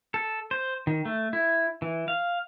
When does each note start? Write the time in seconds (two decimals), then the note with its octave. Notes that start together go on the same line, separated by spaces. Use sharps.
0.14 A4
0.51 C5
0.87 D#3
1.05 A3
1.33 E4
1.82 E3
2.08 F5